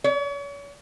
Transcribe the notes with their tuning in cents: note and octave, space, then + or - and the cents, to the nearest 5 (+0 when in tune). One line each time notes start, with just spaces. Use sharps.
C#5 +40